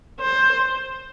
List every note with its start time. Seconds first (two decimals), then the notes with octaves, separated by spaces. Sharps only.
0.20 C5